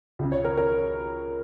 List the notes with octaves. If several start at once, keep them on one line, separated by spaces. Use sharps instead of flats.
C#2 C#3
C#5
A#4
A#4